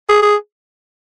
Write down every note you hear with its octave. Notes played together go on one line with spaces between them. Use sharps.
G#4
G#4